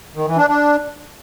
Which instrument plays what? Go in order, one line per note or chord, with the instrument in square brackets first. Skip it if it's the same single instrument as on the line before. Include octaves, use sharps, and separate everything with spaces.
[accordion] D#3
E3
D4
D4